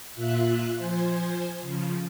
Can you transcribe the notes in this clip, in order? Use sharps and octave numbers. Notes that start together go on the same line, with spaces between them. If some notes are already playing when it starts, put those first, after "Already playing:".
A#2 F4 E5 F#6
F3 C5 G#5
C#3 F3